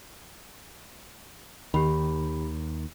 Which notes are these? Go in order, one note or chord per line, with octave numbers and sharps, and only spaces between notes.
D#2 D#3 G4 B5